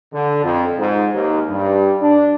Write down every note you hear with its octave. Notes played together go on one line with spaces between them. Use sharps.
D3
F2
G#2
D#2
G2
D4